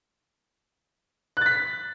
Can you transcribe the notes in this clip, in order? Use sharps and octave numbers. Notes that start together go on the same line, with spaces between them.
F#6 A6 B6